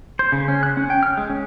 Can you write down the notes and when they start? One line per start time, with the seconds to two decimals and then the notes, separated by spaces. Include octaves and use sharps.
0.19 C5
0.32 C#3
0.48 C#4
0.63 F#6
0.77 C#4
0.90 G5
1.03 F6
1.17 G#3
1.30 C#4